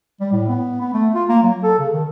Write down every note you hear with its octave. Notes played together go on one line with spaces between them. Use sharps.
G3
A2
B3
B3
A3
F4
A#3
F#3
A4
C#3
D#3